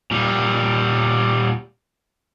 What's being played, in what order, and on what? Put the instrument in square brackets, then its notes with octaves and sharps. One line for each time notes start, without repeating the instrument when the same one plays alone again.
[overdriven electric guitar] A#2 G3